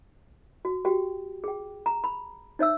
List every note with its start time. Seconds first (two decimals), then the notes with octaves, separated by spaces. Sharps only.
0.65 F#4
0.85 F#4 G4 G5
1.44 G#4 G5
1.86 A#5
2.04 B5
2.59 D#4 C#5 E5 E6